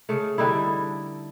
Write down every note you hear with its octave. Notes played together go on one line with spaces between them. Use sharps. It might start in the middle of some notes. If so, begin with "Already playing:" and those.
C#3 A3
D3 G3 D#4 E4